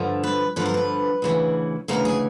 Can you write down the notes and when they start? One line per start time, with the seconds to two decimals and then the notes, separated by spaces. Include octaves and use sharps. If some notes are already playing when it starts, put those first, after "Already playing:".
Already playing: G2 D3 F3
0.24 B4
0.56 G2 D3 F3 B4
0.65 A#4
0.74 B4
1.22 D2 C#3 E3
1.88 D2 C#3 E3 A#4
2.05 G#4